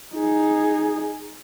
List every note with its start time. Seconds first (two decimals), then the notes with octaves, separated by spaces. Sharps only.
0.15 D#4 G#4